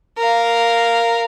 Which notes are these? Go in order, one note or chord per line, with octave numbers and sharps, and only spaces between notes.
A#4 F5